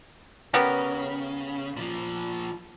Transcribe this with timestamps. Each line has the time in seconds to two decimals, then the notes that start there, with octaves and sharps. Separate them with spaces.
0.54 C#3 G3 B3 A#4
1.77 A#2 F3